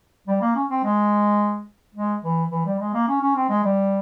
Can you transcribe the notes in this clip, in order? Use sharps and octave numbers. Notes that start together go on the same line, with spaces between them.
G3
A#3
C#4
C4
G#3
G#3
E3
E3
G3
G#3
A#3
C#4
C#4
C4
G#3
G3